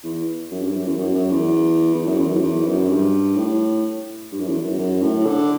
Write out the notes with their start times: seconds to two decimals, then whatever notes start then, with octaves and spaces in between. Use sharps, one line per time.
0.04 E2
0.51 F#2
0.63 G2
0.76 F#2
0.87 E2
0.99 F#2
1.15 F#2
1.31 E2
1.94 E2
2.06 F#2
2.17 E2
2.29 F#2
2.42 E2
2.66 F#2
2.89 G2
3.36 A2
4.32 G2
4.40 F#2
4.47 E2
4.63 F#2
4.79 F#2
5.02 A2
5.26 D3